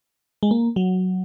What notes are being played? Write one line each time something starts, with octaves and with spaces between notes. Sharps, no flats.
G#3
A#3
F#3